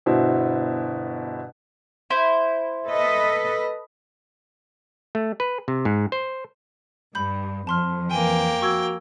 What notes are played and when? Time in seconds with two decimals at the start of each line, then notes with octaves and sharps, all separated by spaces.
0.06 G1 B2 E4 F#4 C5
2.10 E4 C5
2.86 A4 B4 D#5
5.15 A3
5.40 B4
5.68 C3
5.85 G#2
6.12 C5
7.15 G2 B5 G6
7.67 F2 F3 A5 C6 F6
8.11 E3 A#3 G5 G#5
8.62 F#4 C#6 E6 G#6